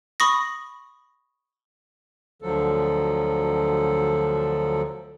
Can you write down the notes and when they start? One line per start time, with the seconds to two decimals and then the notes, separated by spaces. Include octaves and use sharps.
0.20 B5 C#6 D#6 A#6
2.42 D2 D3 F3 F#3 A4